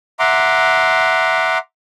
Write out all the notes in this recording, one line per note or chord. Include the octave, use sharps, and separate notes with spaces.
E5 F#5 A#5 C6 D6